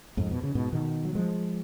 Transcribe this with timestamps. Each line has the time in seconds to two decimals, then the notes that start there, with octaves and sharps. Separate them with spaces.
0.17 F2 G#2
0.31 B2
0.43 C#3
0.55 G#2 B2
0.73 B2 D#3
1.05 F#3
1.15 F3 G#3